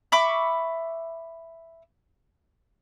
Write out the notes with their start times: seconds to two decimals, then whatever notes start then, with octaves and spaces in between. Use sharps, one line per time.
0.12 E5 B5 C#6 D6